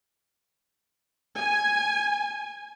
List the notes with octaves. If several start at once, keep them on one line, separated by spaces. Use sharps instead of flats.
G#5